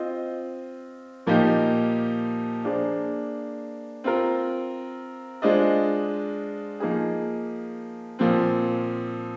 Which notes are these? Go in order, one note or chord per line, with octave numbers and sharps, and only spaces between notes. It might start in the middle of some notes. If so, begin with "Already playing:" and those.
Already playing: C4 F4 C5 D#5
A#2 F3 A#3 D#4 G4
A#3 D4 G#4 C5
C4 F4 A#4
G#3 D4 F4 C5 D#5
F3 A#3 D#4 G#4
A#2 F3 C4